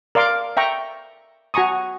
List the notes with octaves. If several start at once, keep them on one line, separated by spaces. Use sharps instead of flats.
A#4 D5 F5 C6 D6
E5 G5 A#5 C#6
F#4 G#5 A#5 C#6 D#6